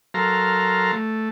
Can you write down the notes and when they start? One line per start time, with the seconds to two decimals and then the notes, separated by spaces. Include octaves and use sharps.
0.14 F#3 A4 A#4 F5 A#5 C6
0.93 A3